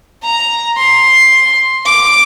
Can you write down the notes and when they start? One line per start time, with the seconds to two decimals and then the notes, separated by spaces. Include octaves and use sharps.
0.24 A#5
0.78 C6
1.86 D6